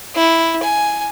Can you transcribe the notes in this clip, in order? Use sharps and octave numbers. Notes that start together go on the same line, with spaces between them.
E4
G#5